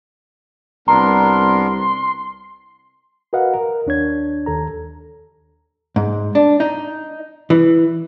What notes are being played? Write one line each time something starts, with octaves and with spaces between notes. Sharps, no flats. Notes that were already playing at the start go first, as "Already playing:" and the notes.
C2 B3 D4 A#4 A#5 C6
F#4 A#4 B4 D#5 F5 F#5
A#4
D#2 D4 C#5 G#6
D#2 A4 A#5
G#2
D4
D#4
E3